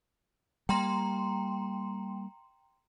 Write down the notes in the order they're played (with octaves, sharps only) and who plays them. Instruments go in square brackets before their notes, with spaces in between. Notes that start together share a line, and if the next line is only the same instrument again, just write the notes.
[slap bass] G3 A#3 [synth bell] G5 A#5 C6